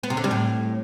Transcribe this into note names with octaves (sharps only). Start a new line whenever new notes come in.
B3
C3
D3
G3
A2